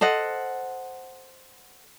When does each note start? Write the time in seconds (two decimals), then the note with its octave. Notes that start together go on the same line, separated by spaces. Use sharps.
0.01 A4 C5 D#5 F#5